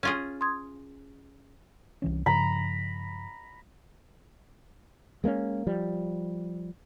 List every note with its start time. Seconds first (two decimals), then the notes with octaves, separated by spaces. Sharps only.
0.03 C#4 F4 G#4
0.41 C6 D#6 G#6
2.02 C2 E3 C#4
2.26 G2 C#3 F3 A#5 B5
5.24 G#3 A#3 B3 C#4
5.67 F3 G3